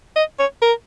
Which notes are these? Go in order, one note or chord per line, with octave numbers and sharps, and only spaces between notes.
D#5
C#5
A#4